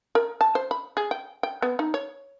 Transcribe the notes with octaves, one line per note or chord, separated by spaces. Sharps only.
A#4
A5
C5
B5
G#4
G5
G5
B3
D#4
C#5